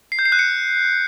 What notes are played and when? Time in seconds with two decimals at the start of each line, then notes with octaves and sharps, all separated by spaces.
0.12 C7
0.19 G6
0.25 C7
0.32 F#6
0.39 C#7